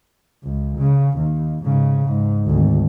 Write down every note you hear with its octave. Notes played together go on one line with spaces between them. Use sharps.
C#2
C#3
D#2
G#2 C#3
G#2
G#1 D2